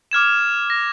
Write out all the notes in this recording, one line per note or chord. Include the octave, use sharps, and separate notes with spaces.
D6 F6 G#6 E7
A#6